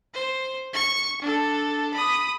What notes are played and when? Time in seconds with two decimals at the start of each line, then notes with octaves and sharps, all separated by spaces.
0.14 C5
0.74 C#6
1.22 D4 A4
1.94 B5 D#6